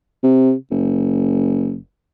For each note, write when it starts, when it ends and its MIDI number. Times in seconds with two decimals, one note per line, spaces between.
0.23 0.53 48
0.71 1.79 30